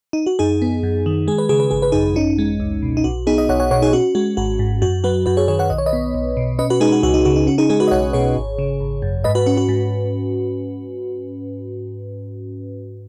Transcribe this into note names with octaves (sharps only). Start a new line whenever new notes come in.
D#4
F#4
F#2 D#4 G#4
B3
F#2
D#3
G#3 G#4
B4
C#3 G#4
B4
G#1 G#4
B4
F#2 D#4 G#4
C#4 D#4
G#3
C#2
B2
D#4
B1 F#4
B3 D#4 G#4
D#5
B1 C#5 F#5
C#5 F#5
B2 C#5 F#5
D#4 G#4
C#4 F#4
G#3 F#4
G#1 F#4
G#2
F#2 F#4
F#3 F#4 B4
F#2 F#4 B4
G#4 C#5
D#3 G#4 C#5
C#5 F#5
B1 D#5
C#5
B4 D#5
B3
B1
B2
C#4 B4 D#5
F#4 B4
G#3 D#4 G#4
F#4
C#2 F#4
D#4
C#3 F#4
D#4
C#4 F#4
D#4 G#4
G#3 D#4 G#4
F#4 B4
D#5
B1 C#5 F#5
B2 G#4 C#5
G#1
C#3
G#1
F#2
G#2 B4 D#5
F#4 B4
C#4 F#4
F#4
G#2